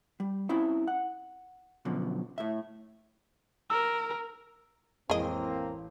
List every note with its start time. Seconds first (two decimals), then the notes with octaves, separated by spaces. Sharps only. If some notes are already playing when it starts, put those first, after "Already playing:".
0.20 G3
0.49 C4 C#4 E4 E5
0.88 F#5
1.85 F#2 B2 D3 F3
2.38 A2 E5
3.70 A#4 E6
5.10 A1 F2 G#3 A#3 C4 G#4 D#5 D7